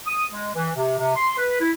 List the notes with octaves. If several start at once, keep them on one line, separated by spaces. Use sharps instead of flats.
D#6
G#3
E3
C3
C3
C6
B4
E4